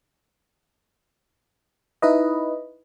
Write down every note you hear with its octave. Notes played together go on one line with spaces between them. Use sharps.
D#4 E4 B4 D#5